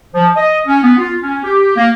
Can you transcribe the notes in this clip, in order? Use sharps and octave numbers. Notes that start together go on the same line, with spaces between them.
F3
D#5
C#4
B3
F4
C#4
G4
A#3